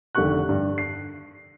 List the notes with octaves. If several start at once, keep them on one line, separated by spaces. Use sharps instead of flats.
F1 D3 D#3 G4 C#6 F#6
G2
C7